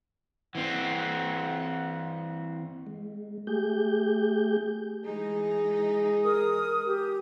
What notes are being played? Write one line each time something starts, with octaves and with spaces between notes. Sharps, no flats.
E3 C4 F#5
G#3
A3 G4 G#4 G6
E3 G#3 D#4 G#4
A#4 D#6
G4